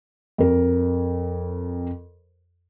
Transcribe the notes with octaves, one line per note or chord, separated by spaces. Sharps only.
F2 A#4